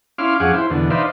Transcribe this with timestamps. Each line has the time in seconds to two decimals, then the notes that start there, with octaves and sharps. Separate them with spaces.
0.18 C#4 E4 F5 C6 D6 F6
0.40 F2 C#4 G#4 F5 F#5 D6
0.54 E4 C5
0.70 E2 B2 D3
0.90 D#4 B4 C5 D5 E5 F5